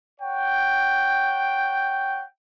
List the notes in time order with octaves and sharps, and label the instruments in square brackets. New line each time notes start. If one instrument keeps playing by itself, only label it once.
[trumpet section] C#5 F#5 G5